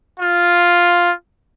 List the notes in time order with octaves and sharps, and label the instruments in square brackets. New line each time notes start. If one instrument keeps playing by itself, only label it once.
[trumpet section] F4